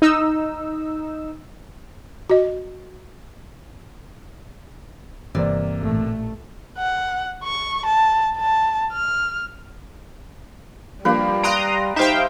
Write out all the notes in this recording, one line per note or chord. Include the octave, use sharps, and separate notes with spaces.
D#4 E6
F#4 D#5
G1 C3 E3 A#3 C4 D5
A1 A#2 A3
F#5
C#6
A5
A5
F6
F3 G3 A#3 D4 G4 B4
F5 A#5 C6 D#6 F#6 D7
D#4 G4 C5 E5 F5 G5